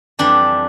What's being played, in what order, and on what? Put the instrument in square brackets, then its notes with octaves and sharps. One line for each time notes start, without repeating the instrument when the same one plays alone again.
[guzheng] F2 E3 G3 D4